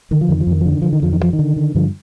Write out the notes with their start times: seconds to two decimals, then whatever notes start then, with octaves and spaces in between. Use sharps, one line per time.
0.11 D3 D#3
0.21 F3
0.29 F2 D#3
0.40 F3
0.47 F2 D#3
0.61 D3 F3
0.72 D#3
0.82 D3 F3
0.93 D#3
1.02 F2 F3
1.13 D#3
1.20 G2
1.23 F3
1.33 D#3
1.39 D3
1.57 D3
1.74 G2 D3 F3